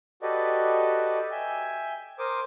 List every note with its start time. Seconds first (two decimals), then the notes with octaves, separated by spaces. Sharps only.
0.22 F#4 G4 A4 B4 D5 D#5
1.31 E5 G5 G#5
2.19 A#4 C5 D6 D#6